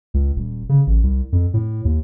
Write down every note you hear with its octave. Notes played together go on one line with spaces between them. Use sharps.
C#2
D#1
C#3
A1
C2
F2
A2
D#2